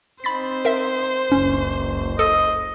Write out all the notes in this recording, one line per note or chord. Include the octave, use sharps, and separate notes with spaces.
C4 D#4 C5 B5 A6 B6
A#4 E5
F#1 C#2 C#4
A4 D#5